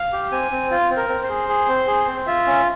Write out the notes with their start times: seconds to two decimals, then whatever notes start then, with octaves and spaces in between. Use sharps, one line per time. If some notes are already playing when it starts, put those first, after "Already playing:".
Already playing: F5
0.13 G4
0.32 C4 G#5
0.51 C4
0.71 F4
0.91 C4
0.97 A#4
1.09 C4
1.23 C5
1.29 G#4
1.49 G#4
1.68 C4
1.87 G#4
2.07 C4
2.27 F4 E5
2.46 C#4